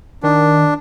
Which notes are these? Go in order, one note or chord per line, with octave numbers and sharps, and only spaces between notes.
D#3 D4